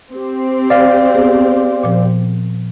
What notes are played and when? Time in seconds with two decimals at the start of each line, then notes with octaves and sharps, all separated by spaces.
0.14 C4 G4
0.70 D5 F5
1.14 B3 G#4
1.84 A#2 F3